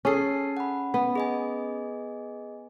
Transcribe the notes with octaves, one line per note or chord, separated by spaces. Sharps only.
C#4 G#4 A4 A5 C7
F#5 B5
B3
G#4 D#5 G#5